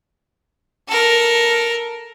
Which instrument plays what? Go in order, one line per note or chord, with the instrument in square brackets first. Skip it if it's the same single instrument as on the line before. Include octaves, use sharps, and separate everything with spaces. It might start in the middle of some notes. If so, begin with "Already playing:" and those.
[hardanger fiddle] A4 A#4